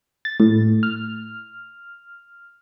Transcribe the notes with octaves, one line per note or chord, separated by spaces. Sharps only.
A6
A2
F6